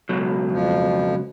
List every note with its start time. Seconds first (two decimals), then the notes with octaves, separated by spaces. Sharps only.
0.09 C#2 B2 F#3
0.52 F2 F3